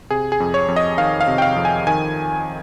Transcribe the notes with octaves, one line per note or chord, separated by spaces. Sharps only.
C3 G#4
G#4
F2
C#5
F2
D#5
D#3 F5
F5
C3
G5
F5
F2
G#5
D#3 G#5